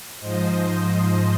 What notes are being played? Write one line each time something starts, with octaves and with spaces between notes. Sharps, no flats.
G#2 F3 C5 D#5